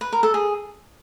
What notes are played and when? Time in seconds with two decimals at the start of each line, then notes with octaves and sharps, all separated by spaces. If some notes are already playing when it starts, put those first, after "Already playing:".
0.01 B4
0.12 A#4
0.23 A4
0.34 G#4